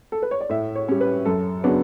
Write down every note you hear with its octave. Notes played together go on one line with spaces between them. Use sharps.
A4
B4
C#5
D5
A2 E5
C#5
G3 C#4
B4
F#2 A4
C#3 F#3 B3 D4